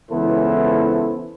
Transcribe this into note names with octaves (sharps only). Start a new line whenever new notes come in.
C#2 E3 B3 E4 A4 C5